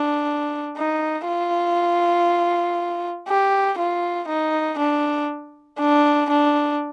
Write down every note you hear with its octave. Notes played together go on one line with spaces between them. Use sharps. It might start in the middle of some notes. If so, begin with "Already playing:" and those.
Already playing: D4
D#4
F4
G4
F4
D#4
D4
D4
D4